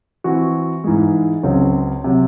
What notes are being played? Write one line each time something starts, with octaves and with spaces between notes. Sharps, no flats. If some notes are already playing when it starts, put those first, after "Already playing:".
E3 C4 F#4
G#2 E3 G#3
C#2 C#3 F#3 C4
C3 F#3